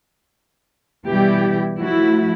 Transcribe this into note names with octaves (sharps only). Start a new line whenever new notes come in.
B2 E3 G3 E4 G4
F3 A3 E4 F#4